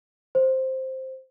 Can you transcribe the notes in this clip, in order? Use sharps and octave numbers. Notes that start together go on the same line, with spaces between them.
C5